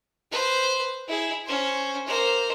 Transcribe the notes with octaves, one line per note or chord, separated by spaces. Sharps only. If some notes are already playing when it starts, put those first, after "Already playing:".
B4 C5
E4 G#4
C#4 C5
A#3 C5